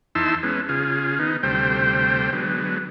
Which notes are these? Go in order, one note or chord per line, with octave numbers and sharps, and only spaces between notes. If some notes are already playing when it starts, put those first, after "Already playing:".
E2 D#4 E4 A5 C6 E6
G#3 B3 C#4
C#3 F4 G#4
D#3 B3 D#4
D2 C3 G3 A3 C5 G5
D3 F#3 G#3 B3